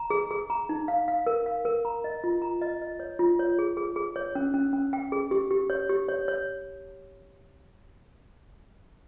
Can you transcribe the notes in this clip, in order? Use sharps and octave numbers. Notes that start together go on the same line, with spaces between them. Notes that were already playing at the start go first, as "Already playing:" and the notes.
Already playing: A#5
G#4
G#4
A#5
D#4
F5
F5
A#4
F5
A#4
A#5
D#5
F4
A#5
D#5
D#5
C#5
F4
C#5
G#4
G#4
G#4
C#5
C#4
C#4
C#4
G5
G#4
G4
G4
C#5
G4
C#5
C#5